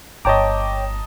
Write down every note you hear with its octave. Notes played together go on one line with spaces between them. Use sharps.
G1 C#5 D#5 G5 A5 A#5 D6